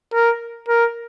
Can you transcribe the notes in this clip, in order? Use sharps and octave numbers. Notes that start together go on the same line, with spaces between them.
A#4
A#4